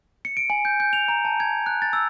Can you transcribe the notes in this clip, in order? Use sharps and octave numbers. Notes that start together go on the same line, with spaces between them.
C#7
D7
G#5
G6
G6
F7
A#5
A5
G#6
F#6
A6
E6